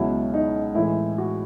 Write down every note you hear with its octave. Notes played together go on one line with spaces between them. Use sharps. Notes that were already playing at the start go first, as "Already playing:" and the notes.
Already playing: C#2 B2 F#3 E4
D#4
A2 E3 G#3 E4
F#4